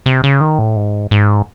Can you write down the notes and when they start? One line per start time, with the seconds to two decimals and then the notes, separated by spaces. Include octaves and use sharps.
0.06 C3
0.24 C#3
0.41 D#3
0.59 A2
0.76 G#2
1.11 G#2